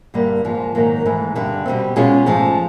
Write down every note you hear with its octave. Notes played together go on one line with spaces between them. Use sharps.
G2 D3 G3 A#3
G#2 F3 A#3
G#2 D#3 F#3 A#3
G#2 E3 A3
G2 D3 G3
B2 G3 C4
B2 G#3 C#4 F4 G#4
G#2 F3 A3